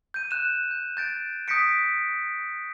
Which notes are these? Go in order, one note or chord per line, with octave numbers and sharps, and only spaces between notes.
G6 D#7
F#6 E7
G6
G6 A6 D7
D#6 G6 A#6 B6 C#7 D7